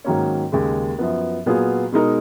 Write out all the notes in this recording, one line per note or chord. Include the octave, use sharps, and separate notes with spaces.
G#2 D#3 F#3 A#3 C#4
D#2 C#3 G#3
F#2 F3 B3
A#2 F#3 B3 F4 G#4
B2 G#3 D#4 A#4